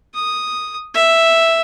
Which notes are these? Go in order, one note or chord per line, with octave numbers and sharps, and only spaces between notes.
D#6
E5